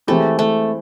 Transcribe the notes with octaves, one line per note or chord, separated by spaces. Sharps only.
E3 G#3 A3 C4 E4 G4
A3